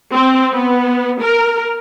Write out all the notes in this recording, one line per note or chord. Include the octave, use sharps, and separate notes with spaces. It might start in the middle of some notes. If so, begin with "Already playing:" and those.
C4
B3
A#4